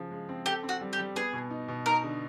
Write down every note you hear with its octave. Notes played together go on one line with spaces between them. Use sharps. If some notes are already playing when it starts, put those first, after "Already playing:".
Already playing: C#3 F3
G#3
C4
G4 A4
C4
F#4
G3
G4
G3
B3 G#4
B2
D#4
B2
D#4 A#4
D3